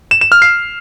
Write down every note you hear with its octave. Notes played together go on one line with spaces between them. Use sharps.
E7
E7
F6
C7